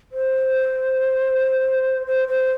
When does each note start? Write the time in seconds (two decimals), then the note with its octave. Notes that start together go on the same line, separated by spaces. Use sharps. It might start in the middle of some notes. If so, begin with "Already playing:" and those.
0.12 C5
2.07 C5
2.28 C5